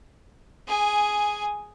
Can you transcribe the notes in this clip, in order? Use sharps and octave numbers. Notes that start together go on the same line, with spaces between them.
G#4 G#5